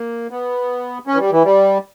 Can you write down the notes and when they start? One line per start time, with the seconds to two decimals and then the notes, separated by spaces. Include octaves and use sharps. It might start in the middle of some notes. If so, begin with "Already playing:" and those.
Already playing: A#3
0.31 B3
1.07 C#4
1.14 E3
1.19 G3
1.32 E3
1.44 G3